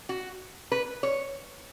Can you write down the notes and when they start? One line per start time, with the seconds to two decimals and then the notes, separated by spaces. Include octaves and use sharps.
0.09 F#4
0.72 B4
1.03 C#5